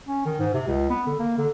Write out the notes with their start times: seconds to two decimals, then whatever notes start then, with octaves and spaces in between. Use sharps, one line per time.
0.08 C#4
0.25 D#3
0.40 G#2
0.54 C3
0.67 C#2
0.90 B3
1.06 D3
1.19 A#3
1.38 D3